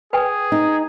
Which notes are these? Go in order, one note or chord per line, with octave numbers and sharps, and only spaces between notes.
G#4 B4 G5 G#5
D#4